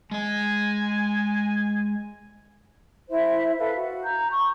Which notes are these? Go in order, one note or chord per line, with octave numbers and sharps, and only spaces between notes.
G#3 D#5 G#5
E4 C5 E5
A4 B4 E5 F5
F#4
A#5 G6
C#6